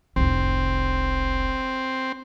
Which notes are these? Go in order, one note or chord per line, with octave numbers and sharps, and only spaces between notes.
F1 C2 C4